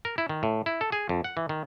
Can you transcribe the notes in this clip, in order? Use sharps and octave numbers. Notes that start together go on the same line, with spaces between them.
A#4
E4
D#3
A2
E4
A4
G#4
F2
F#5
E3
D#3